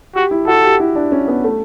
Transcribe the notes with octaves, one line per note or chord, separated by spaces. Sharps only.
F#4 G4
E4
F#4 A4
G4
E4
D4
C#4
B3
A3